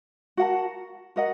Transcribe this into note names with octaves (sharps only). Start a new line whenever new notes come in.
F#4 A#4 F#5 A5
F#4 A#4 D#5 F#5